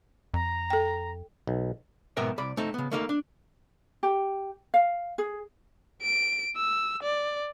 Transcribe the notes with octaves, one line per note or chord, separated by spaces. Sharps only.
F2 A#5
A4 G5
B1
B1 G#2 B3 A#4 E5 G5
C2 D5 B5
A3 C4 D#4
C#3 B3
A3 A#3 D#4 A#4 D#5 F5
D4
G4
F5
G#4
D7
E6
D5